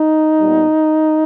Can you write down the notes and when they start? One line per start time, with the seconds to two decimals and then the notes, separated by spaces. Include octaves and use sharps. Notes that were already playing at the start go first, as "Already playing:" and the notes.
Already playing: D#4
0.39 A#2 G3 B3